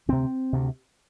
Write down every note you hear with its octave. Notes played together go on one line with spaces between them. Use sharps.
D2 C3 C4
D2 C3